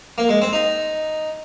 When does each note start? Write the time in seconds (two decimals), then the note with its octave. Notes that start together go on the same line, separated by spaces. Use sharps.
0.18 A#3
0.29 G#3
0.42 C4
0.53 D#4